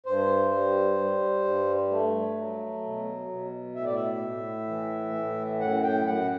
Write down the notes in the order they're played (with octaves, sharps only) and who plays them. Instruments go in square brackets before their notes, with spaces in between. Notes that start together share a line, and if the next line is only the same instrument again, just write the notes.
[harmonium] G2 C5
G3
G3
G2
A3
F#3
B2
B2
A2 E5
D5
E5
A2
E3
A2
F#2 F#5
G5
F#2 F#5